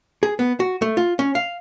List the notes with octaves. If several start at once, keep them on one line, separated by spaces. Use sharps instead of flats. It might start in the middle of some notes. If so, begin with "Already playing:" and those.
G#4
B3
F#4
A3
F4
C#4
F5